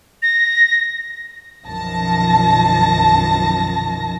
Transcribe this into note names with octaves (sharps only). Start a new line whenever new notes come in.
A#6
B1 F#2 D#3 F3 A5 A#6